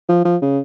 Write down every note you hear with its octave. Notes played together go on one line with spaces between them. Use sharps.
F3
F3
C#3